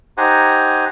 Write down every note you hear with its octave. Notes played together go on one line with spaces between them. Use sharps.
D#4 G4 C5 F#5 G#5 A#5